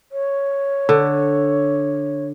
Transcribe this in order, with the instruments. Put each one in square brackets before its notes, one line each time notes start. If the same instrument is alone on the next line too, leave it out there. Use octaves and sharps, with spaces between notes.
[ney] C#5
[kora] D3